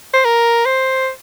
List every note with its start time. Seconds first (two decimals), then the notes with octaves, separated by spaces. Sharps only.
0.13 C5
0.25 A#4
0.66 C5